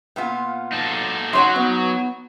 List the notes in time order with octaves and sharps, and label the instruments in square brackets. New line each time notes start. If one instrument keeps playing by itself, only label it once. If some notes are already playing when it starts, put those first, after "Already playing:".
[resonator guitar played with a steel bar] A#2 B3 F4
[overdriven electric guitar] D#4 A4
[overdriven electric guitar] F#3 F#4 [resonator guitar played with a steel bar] D#4 C#5 F#5 [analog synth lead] C6
[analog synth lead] B3 [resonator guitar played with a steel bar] D#4